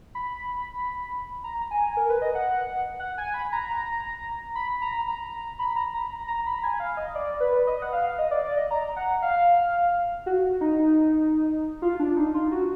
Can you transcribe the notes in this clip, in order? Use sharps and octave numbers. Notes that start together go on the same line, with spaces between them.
B5
A#5
G#5
A#4
B4
D#5
F#5
F#5
G#5
B5
A#5
B5
A#5
A#5
B5
A#5
A#5
A#5
A#5
B5
G#5
F5
D#5
D5
B4
D#5
F#5
F5
D#5
D5
D5
D#5
A#5
F#5
F5
F#4
D#4
F4
D4
D#4
F4
F#4